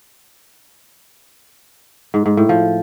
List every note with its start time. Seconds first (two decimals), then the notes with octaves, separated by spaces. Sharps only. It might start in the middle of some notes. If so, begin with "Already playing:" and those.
2.14 G#2
2.26 G#2
2.37 A2
2.49 F3